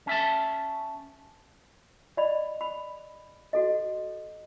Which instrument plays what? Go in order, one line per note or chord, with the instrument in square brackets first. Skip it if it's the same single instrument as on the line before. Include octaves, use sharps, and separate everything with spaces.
[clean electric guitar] C#4 E5 A5
[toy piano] D5 D#5 B5
B5
F#4 A4 D#5